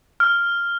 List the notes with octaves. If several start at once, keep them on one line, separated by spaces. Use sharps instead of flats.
F6